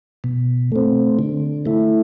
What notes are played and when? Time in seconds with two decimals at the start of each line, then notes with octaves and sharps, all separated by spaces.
0.24 B2
0.72 A3 C4
1.19 D3
1.66 A3 E4